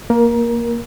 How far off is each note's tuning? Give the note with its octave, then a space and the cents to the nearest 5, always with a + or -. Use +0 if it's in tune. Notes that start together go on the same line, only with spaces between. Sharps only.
A#3 +0 A#4 +20